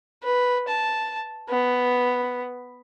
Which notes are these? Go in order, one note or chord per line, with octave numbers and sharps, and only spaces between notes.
B4
A5
B3